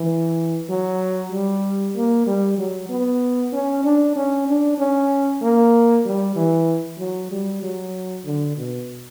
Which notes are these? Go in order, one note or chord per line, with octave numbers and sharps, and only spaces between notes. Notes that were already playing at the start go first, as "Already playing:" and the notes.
Already playing: E3
F#3
G3
A#3
G3
F#3
B3
C#4
D4
C#4
D4
C#4
A#3
G3
E3
F#3
G3
F#3
D3
B2